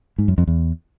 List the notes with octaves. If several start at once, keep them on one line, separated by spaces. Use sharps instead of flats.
G#2
F#2
F2
E2